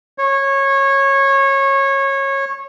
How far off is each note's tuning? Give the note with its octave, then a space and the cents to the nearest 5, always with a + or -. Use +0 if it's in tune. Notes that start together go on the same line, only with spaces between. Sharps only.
C#5 -20